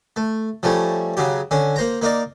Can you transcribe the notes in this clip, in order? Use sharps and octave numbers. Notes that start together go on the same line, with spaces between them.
A3
F3 G3 A3 C#4
C#3 F#3 G4
D3 C#4
A#3 C5 A#5
A#3 D#4 A#4 D5